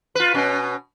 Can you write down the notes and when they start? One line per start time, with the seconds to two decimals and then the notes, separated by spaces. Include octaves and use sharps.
0.15 F4 B4
0.34 B2 C#4